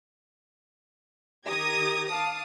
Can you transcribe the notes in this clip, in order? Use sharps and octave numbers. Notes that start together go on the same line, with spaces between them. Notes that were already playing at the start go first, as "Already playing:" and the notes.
D#3 G4 A#4 D#6 G#6 A#6
F5 A5 D6 D#6